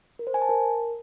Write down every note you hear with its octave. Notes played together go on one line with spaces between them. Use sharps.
A#4
C5
G#5
A5
A#4